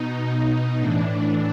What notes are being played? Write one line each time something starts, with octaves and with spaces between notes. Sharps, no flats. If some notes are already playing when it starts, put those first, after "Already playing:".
Already playing: B2 D#4
A2 E3 D4
D4